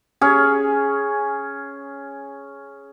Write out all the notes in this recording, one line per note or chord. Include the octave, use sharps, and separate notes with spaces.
C#4 G#4